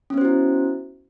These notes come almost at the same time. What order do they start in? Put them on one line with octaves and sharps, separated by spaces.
C#4 B3 C5 F#4 E4